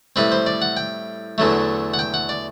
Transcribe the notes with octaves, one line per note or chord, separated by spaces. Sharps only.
A2 G3 C4 B4
C5
D5
F#5
G5
E2 D3 F#3 A3
F#5
G5
F#5
D5